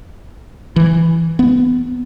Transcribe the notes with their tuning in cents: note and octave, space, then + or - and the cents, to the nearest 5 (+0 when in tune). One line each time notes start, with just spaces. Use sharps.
E3 +5
B3 +20